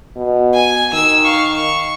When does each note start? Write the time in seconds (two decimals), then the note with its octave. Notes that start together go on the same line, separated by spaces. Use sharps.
0.16 B2
0.54 G#5
0.93 D#3 E6
1.24 F5 C#6
1.53 C#6